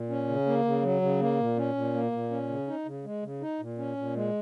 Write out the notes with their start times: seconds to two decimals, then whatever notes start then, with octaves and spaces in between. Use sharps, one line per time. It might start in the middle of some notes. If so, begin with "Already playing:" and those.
Already playing: A#2
0.10 C#4
0.28 C#3
0.46 A#3
0.65 C#3
0.83 F#3
1.02 C#3
1.20 A#3
1.39 A#2
1.57 C#4
1.75 A#2
1.94 A#3
2.12 A#2
2.31 C#4
2.49 C#3
2.68 D#4
2.86 C#3
3.05 G#3
3.23 C#3
3.41 D#4
3.60 A#2
3.78 C#4
3.97 A#2
4.15 G#3